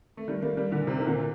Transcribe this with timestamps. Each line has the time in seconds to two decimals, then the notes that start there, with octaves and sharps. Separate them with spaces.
0.17 A3
0.28 D#3 G3
0.42 G3 A#3
0.57 G3 A#3
0.72 A#2 D3
0.86 C3 D#3
1.00 D#3
1.07 A#2 D3